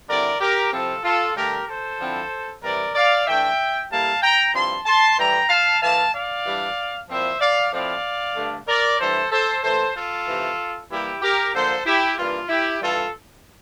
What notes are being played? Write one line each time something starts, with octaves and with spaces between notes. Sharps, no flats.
D3 G3 C4 E4 A#4 D5
G4 A#4
C3 F3 C4 E4 F4 A4
F4 A4
G2 D3 A3 G4 A#4
A4 C5
D3 F3 C4 E4
C3 E3 G3 A#4 D5
D5 F5
E3 A3 D4 E5 G5
A2 G3 A#3 E4 F5 A5
G5 A#5
G2 F3 C4 E4 A5 C6
A5 C6
A2 E3 G3 G5 A#5
F5 A5
A2 E3 A#3 F5 A5
D5 F5
E3 G3 D4
A#2 F3 C4 E4 C5 E5
D5 F5
A2 F3 C4 E4 D5 F5
G2 D3 A3 D4
A#4 D5
A2 E3 G3 D4 A4 C5
A4 C5
A2 E3 A3 A4 C5
F4 A4
C3 E3 A3
E3 G3 A#3 E4 G4
G4 A#4
D3 F3 A#3 D4 A4 C5
E4 G4
G2 E3 A#3 D4 F4
E4 G4
G2 E3 G3 F4 A4